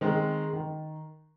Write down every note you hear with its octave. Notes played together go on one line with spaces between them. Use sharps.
D#3 G#3 C4
D#3